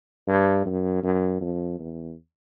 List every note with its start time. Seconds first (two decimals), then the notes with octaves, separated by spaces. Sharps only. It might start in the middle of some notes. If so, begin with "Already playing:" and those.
0.28 G2
0.65 F#2
1.03 F#2
1.41 F2
1.79 E2